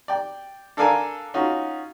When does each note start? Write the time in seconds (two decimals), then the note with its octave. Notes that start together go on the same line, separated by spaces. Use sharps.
0.08 D5 G5
0.77 D4 A4 A#4 D5 F5 G#5
1.34 C#4 D#4 F4 F#4